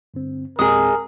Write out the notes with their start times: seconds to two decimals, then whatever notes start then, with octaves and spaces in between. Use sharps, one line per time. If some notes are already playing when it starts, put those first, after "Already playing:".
0.14 G2 D3 C4
0.59 E2 A#2 G#3 C4 G#4 A#4 D#6